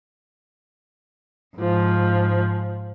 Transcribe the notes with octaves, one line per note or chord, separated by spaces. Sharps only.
G#2 F3